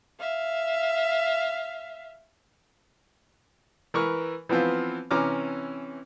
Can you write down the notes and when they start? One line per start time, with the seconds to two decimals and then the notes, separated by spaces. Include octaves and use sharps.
0.20 E5 F5
3.94 E3 A#4 B4 C#6 F6
4.49 E3 F3 B3 C4 F4
5.11 C3 E3 C#4 A#5 D6 F6